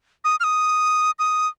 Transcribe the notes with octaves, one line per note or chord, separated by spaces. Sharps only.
D#6
F6
D#6
D#6